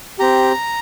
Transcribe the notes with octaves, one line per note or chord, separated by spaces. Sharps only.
C4 G4 A#5